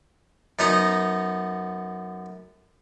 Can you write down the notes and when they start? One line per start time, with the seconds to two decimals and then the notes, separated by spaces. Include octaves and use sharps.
0.59 F#2 B3 D#4 A#5